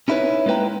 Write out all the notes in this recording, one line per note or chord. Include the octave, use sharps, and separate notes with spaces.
C#4 D#4 E4 F#4 B4 C#5
G#3 A#3 E4 B4 G5 A#5